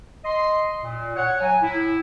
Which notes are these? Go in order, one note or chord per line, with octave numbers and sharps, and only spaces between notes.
D#5 C6
A#2
C#5 F#5
F#3 G#5
A2 E4